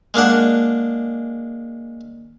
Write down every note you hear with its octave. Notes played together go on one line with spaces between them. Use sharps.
G#3 A#3 D4 F#5